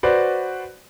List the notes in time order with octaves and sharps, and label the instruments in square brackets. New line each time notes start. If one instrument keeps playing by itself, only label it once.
[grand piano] F#4 B4 C5 D5